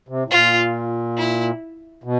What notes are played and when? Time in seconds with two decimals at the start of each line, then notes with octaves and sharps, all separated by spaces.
0.08 C3
0.25 A2
0.30 A#2 F4
1.17 E4
2.04 B2